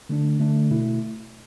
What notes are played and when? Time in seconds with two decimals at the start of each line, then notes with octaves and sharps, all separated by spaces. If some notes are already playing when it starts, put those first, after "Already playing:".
0.09 D3 A3 D4
0.39 D3 A3 D4
0.71 B2 A3 E4